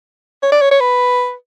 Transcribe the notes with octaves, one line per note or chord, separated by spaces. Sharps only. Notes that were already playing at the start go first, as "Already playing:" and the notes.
C#5
D5
C#5
C#5
B4